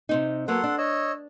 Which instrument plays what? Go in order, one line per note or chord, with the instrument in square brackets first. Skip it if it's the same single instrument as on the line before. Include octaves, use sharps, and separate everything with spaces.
[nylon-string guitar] C3 C4 D#4
[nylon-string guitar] F#3 A#3 B3 [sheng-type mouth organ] A4 F#5 C6
[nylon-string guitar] D4
[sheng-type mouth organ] C#5 D#5 E6